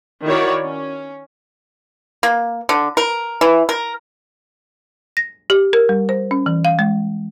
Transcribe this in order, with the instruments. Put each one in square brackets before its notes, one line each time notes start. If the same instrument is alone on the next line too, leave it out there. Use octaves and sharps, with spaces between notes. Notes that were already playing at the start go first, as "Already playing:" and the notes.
[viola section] D#3 E4 F#4 C#5 D5
C#4
[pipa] A#3
D3
A#4
E3
A#4
[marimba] A#6
G4
A#4
G3
C5
C#4
E3
F5
G#3